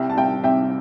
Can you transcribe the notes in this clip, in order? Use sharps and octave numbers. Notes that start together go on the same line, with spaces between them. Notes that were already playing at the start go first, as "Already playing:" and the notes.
Already playing: C2 E5 G5
A5
C2 E5 G5
C3 E5 G5